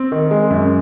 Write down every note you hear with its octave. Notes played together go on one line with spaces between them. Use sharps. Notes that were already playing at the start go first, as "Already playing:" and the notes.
Already playing: C4
D#3
G#3
F#2